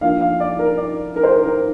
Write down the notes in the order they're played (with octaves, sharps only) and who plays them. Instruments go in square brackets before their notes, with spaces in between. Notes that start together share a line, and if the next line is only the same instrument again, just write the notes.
[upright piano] F3 A#3 D4 F5
F5
D5
A#4
D5
A#4
C5
A#4
A#4